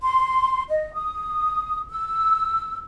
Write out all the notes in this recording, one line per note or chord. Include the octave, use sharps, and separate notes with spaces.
C6
D#5
D#6
E6